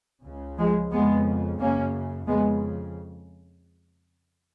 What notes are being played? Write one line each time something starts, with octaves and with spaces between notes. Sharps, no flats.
C#2 C#3
F3 G#3
F2 C#3 G#3 B3
F#2 C#3 A#3 C#4
F2 C#3 G#3 B3